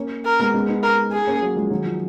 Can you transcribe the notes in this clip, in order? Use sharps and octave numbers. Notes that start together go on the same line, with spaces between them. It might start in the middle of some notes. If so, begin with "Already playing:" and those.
Already playing: A#3 C#4
A#4
G#3 B3
G#3 B3
B3 D#4
A#4
G#4
A#3 C#4
F#3 A#3
F3 G#3
D#3 F#3
F3